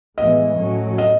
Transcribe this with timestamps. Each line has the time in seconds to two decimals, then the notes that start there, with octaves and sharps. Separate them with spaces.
0.17 A2 E3 G#3 B3 D#5
0.58 A2 F#3 A3 C#4
0.98 D#5